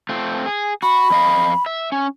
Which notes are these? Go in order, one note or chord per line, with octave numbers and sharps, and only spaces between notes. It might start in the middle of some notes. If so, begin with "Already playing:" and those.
A3 C4 F4
G#4
F#4 B5
F2 D#5 F5
E5
C#4